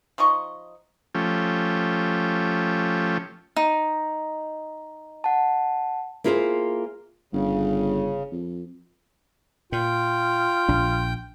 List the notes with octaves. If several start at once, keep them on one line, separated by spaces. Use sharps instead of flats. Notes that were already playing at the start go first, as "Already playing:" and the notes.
F3 D#4 D#5 C#6
F3 A3 C#4 G4
D#4
F#5 A5
A#3 E4 F4 G#4 A#4 C5
G1 C#3
F2
A#2 F4 G5
A#1 D4